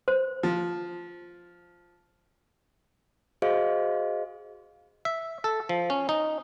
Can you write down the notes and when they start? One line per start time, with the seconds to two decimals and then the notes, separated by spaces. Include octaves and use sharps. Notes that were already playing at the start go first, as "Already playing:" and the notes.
0.08 C5
0.43 F3
3.42 F#4 G#4 C5 D#5 F5
5.05 E5
5.44 A4
5.69 F3
5.90 C#4
6.09 D#4